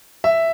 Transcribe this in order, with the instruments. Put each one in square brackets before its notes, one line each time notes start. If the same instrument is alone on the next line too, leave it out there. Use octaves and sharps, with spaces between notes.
[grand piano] E5